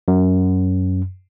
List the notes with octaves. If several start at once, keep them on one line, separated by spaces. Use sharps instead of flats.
F#2